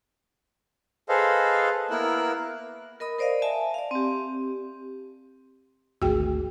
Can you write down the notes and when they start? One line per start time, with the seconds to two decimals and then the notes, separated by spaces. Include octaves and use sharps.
1.09 G#4 A4 B4 C5 D#5 F5
1.91 A#3 B3 E4 A#4 E6 F#6
3.00 A#4 D#5 B5 D#6
3.18 A#4 C5 D5 D#5 F5
3.42 E5 G#5 A5
3.74 D5 F5
3.91 C4 G4
6.02 G#1 D2 F#4 G#4 G5